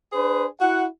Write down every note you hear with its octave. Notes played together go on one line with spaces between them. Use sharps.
D4 G#4 B4 C5
E4 F#4 F#5